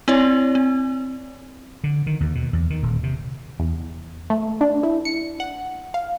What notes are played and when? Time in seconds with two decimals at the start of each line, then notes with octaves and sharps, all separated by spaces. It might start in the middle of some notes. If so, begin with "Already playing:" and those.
0.08 C4 E4 C#5 D5
0.55 C4
1.84 D3
2.07 D#3
2.20 D#2
2.35 B2
2.53 E2
2.70 D#3
2.83 D#1
3.03 C3
3.59 E2
4.30 A3
4.61 D4
4.83 E4
5.05 C#7
5.40 F#5
5.94 F5